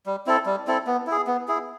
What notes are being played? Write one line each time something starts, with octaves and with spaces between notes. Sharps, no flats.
G3
C4 E4 A4
G3
C4 E4 A4
B3
E4 G#4
B3
E4 G#4